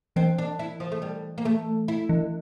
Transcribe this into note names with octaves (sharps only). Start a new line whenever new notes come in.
E3 C4
D4
E4
F3
A3
G3
A#3
A3
E4
E3